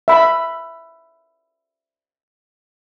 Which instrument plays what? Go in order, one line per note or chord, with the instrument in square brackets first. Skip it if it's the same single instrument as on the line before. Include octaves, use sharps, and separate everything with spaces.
[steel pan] E5 B5